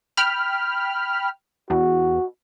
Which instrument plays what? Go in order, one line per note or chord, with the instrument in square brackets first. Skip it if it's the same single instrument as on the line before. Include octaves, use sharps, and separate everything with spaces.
[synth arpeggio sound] G5 B5 F6
[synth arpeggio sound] E2 [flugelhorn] F#4